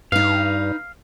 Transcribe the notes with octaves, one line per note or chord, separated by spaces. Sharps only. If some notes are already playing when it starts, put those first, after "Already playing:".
G2 D#4 B4 F5